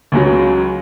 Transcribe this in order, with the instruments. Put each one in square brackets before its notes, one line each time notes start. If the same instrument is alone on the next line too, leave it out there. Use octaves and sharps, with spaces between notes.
[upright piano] C#2 C#3 F#3